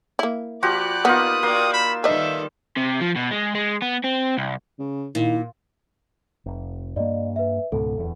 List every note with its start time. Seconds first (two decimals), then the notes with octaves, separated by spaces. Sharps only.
0.19 A#3 E4
0.63 F3 F#4 G4 D5 B5 F#6
1.05 A#3 B3 D#4 F4 D#6
1.43 A#3 F#4 D5 G5 C6
1.73 B5 E6
2.04 D#3 G3 A4 B4 D#5 E5
2.76 C3
3.00 F3
3.16 B2
3.31 G#3
3.55 G#3
3.82 B3
4.04 C4
4.38 C2
4.79 C#3
5.15 A#2 D#3 E4
6.46 F1
6.96 G2 A#3 D5 D#5
7.36 B4 E5
7.72 C#2 G#2 B2 A4
7.97 D1 E2